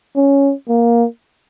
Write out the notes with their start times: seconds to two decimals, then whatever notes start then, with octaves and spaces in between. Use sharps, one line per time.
0.16 C#4
0.69 A#3